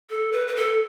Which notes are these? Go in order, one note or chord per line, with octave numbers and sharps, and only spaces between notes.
A4
B4
B4
A4